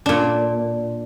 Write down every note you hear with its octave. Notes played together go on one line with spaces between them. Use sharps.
A#2 D4